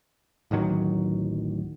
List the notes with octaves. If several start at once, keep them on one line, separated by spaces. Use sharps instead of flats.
D1 A1 D#3 F#3